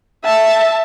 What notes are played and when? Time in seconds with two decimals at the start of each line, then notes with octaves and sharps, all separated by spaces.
0.24 E5 A5